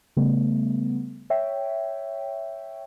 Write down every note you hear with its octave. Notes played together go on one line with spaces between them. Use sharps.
C#3 G3 A3 B3
C#5 E5 G5